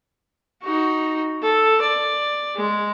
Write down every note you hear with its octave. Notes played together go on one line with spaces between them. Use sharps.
D#4 F#4
A4
D5
G#3